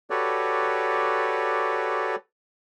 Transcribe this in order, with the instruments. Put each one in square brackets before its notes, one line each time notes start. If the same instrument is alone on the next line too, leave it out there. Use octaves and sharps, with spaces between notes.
[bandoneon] F#4 G4 A4 B4 C#5 D5